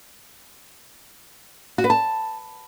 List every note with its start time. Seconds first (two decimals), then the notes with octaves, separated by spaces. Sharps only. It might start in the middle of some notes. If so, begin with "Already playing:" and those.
1.78 F#4
1.84 B4
1.90 A5